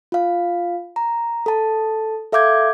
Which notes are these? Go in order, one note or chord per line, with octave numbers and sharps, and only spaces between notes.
F4 F5
A#5
A4 A5
A4 E5 F5 D6 G6 G#6